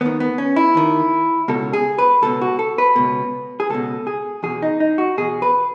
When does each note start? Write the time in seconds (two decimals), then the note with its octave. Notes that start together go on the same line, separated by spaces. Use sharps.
0.01 D#2 D#3 B3
0.20 B3
0.38 C#4
0.56 E4
0.75 D#2 D#3
1.48 C#2 B2 A4
1.73 G#4
1.98 B4
2.22 C#2 B2 A4
2.41 F#4
2.59 A4
2.78 B4
2.96 C#2 B2
3.60 G#4
3.70 C#2 B2 A4
4.07 G#4
4.43 E2 B2 G#4
4.62 D#4
4.80 D#4
4.98 F#4
5.18 E2 B2 G#4
5.42 B4